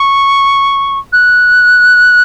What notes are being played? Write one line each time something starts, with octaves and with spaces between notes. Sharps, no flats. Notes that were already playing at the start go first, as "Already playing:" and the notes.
Already playing: C#6
F#6